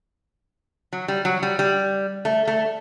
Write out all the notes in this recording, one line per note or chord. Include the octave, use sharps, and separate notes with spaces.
F#3
G3
F#3
G3
G3
A3
A3